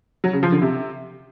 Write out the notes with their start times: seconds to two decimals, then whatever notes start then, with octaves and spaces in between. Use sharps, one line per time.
0.24 F#3
0.33 C#3
0.43 F3
0.52 D3
0.62 C3